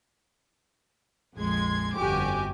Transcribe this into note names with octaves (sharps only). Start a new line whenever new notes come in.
A#1 F2 G#3 C6 G#6
G1 F2 F#4 G4 G#5 D6